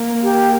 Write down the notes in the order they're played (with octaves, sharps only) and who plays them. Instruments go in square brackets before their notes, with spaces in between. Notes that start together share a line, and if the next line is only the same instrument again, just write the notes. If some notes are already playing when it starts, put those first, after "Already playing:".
Already playing: [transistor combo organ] A#3
[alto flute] G4